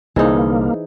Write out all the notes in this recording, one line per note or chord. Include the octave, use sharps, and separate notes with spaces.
C2 D3 E3 A#3 D#4 G#4 C5 D#5